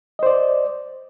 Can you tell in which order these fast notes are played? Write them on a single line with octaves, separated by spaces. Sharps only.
D#5 C5 D5